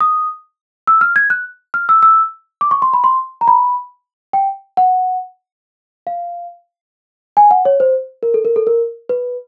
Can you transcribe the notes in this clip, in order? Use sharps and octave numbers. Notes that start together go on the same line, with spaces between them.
D#6
E6
F6
G#6
F#6
F6
E6
E6
D6
C#6
C6
B5
C6
A#5
B5
G5
F#5
F5
G#5
F#5
C#5
C5
A#4
A4
A#4
A4
A#4
B4